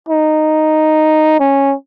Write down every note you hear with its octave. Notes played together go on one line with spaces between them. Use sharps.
D#4
C#4